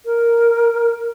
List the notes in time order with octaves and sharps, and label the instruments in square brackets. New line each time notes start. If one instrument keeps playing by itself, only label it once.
[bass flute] A#4